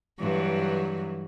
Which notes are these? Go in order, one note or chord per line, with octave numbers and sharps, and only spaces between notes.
G2 E3 F#3